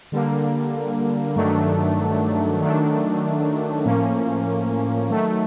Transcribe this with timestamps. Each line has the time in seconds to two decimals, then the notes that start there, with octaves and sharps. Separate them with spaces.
0.12 D3 G3 A#3
1.36 G2 D#3 F#3 A3 D4
2.61 D#3 F#3 A3 D4
3.85 A2 F3 A#3 C#4
5.10 D#3 F#3 A3